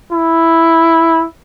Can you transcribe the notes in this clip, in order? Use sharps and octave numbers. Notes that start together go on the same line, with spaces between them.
E4